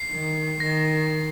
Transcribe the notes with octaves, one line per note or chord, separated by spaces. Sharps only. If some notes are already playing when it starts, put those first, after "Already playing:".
Already playing: C7
D#3
D#3 A#6